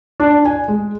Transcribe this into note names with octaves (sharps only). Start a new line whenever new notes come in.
D4
G#5
G#3